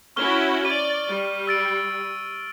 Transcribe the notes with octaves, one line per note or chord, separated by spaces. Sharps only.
C#4 E4 F#4 C#6 F6 G7
D5 D#7
G3
E6 A6 D7